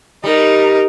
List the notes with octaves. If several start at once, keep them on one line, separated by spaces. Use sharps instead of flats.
G3 D#4 A#4